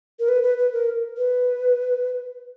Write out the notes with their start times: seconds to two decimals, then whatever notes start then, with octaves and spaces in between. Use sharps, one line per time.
0.19 A#4
0.28 B4
0.43 B4
0.59 B4
0.73 A#4
1.17 B4